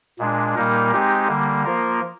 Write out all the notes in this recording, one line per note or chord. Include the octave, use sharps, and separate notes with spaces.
A#2 G#3 D4
A#2 G3 A#3 D#4 A#4
G#3 C4 D#4 G4
D3 G3 A#3
F3 A#3 F4 A#4